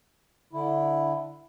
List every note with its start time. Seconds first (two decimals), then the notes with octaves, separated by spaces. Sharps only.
0.53 D3 E4